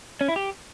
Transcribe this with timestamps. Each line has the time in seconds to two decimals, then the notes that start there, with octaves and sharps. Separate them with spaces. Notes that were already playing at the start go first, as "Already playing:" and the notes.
0.21 C#4
0.28 E4
0.36 G4